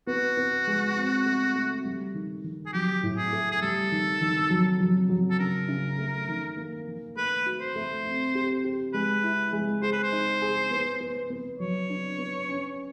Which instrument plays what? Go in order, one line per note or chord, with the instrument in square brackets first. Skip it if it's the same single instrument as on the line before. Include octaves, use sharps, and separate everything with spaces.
[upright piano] B3 [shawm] F#4
[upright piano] B3
G#3
C4
A3
A3
G3
D#3
D#3
[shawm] G#4
[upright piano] F#3 [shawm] G4
[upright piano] A2
[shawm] G#4
[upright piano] A3
[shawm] G#4
[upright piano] G3 [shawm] A4
[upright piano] D#3
D#3
F#3
F#3
F#3
[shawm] A4
[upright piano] C#3 [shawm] A#4
[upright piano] C#3
A3
D#3
A#3
D#3
[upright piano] A3 [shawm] B4
[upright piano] F#4
[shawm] C5
[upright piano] A3
C4
G4
G4
[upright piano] G#3 [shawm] B4
[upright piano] E4
G#3
[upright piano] G#4 [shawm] C5
[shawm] B4
C5
[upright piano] D#4
G#4
B3
B3
B3
[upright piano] F#3 [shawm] C#5
[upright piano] D4
B3
C#4